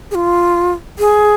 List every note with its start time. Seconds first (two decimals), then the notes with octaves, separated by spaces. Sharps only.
0.11 G#4
0.15 F4
0.99 G#4